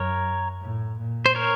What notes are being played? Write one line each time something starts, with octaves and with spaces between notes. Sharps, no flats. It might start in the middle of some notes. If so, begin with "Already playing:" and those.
Already playing: F#2 A#4 C#5
A2
A#2
C5
A#4 C#5